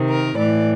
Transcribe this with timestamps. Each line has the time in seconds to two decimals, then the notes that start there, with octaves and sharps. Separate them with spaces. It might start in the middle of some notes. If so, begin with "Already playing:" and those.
Already playing: C3 D#3
0.09 A#4
0.36 A2 E3 D5